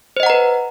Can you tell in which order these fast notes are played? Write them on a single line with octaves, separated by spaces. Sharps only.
C5 D#5 F#5 A#5 B4